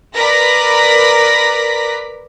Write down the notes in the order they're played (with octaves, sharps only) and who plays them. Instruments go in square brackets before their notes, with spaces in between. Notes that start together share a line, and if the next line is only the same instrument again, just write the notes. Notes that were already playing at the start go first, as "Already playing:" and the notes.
[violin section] A#4 B4 D5 A#6 B6